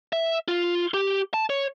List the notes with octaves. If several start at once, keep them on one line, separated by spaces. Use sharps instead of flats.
E5
F4
G4
A5
C#5